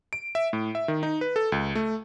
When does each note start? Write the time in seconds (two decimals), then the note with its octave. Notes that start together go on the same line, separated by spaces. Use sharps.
0.13 D7
0.35 E5
0.53 A2
0.75 E5
0.88 D#3
1.03 D#4
1.21 B4
1.36 A4
1.52 C#2
1.75 A3